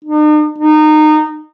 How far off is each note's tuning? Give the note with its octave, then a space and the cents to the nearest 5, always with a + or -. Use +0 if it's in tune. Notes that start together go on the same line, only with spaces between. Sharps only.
D#4 -45
D#4 -25